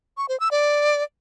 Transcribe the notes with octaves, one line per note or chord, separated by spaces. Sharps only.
C#6
C5
E6
D5